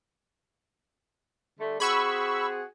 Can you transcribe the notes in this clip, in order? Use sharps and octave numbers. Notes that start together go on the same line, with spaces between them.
D3 G3 A3
C4 F#4 G#4 B5 C#6 E6